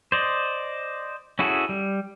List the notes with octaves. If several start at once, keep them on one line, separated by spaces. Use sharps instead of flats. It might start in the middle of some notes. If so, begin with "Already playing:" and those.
C5 D5 D#5
C#4 E4 F#4 G#4 A4
G3